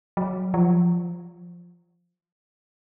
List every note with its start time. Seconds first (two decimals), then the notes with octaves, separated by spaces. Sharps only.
0.17 F#3
0.54 F3